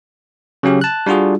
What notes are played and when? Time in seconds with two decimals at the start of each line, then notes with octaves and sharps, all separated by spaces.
0.63 C#3 F#3 C#4 G4
0.81 A5 F#6
1.06 G3 D4 F4 F#4 G#4